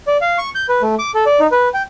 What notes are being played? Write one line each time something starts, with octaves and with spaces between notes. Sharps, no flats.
D5
F5
C#6
G6
B4
A3
D6
A4
D5
D#4
B4
G5